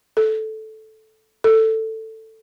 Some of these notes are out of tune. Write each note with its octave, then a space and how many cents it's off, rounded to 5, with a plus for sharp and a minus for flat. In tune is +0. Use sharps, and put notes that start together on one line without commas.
A4 -10
A4 +10